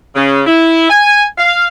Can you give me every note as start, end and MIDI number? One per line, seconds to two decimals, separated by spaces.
0.15 0.42 49
0.47 0.87 64
0.90 1.23 80
1.38 1.67 77